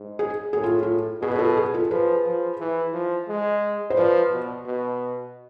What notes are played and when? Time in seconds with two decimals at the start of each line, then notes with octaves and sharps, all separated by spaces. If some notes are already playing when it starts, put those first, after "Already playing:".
Already playing: G#2
0.19 G#4
0.53 A2 G#4
0.64 F4
0.83 F4
1.21 B2 G#4
1.36 B4
1.39 F4 A4
1.57 G#4
1.74 F4 A4
1.91 F3 G#4 B4
2.26 F3
2.60 E3
2.94 F3
3.28 G#3
3.90 C5
3.97 F3 B4 D5
4.32 B2
4.66 B2